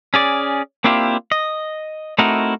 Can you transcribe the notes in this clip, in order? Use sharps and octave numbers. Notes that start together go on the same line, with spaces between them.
C#4 G#4 D5
A#3 C4 D4 E4 F4 G4
D#5
A3 C4 D#4 E4 F#4 A#4